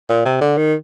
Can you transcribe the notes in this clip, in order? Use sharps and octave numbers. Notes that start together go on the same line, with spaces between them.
A#2
C3
D3
D#3